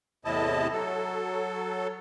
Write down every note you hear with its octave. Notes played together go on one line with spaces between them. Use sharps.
E2 A2 C3 E4 D#5 A5
F#3 A4